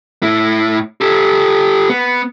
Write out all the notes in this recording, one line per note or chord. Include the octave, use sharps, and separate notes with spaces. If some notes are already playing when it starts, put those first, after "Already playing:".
A2 E4
G4 A4
B3